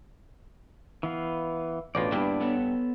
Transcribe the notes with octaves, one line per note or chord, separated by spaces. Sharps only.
E3 B3 F5
A1 B2 D4 F4 D5
G2 A#3 B3 E4
B3 A4 C#5